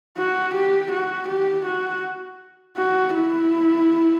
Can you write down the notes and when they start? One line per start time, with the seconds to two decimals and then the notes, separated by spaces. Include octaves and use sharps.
0.18 F#4
0.55 G4
0.92 F#4
1.29 G4
1.66 F#4
2.77 F#4
3.14 E4